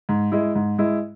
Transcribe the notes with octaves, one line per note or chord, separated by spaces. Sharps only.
G#2
G#3 E4
G#2
G#3 E4